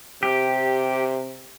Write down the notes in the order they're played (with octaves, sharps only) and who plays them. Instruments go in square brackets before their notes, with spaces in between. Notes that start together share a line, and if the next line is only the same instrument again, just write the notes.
[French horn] C3 [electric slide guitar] G4